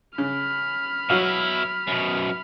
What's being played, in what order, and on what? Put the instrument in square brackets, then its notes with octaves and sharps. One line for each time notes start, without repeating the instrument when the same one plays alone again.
[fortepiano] C#3 [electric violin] B5 F6
[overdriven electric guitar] B2 E4 [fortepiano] F#3 F#4 F5
[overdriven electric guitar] F#2 B2